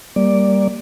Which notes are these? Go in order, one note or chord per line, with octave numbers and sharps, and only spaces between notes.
G3 A#3 D5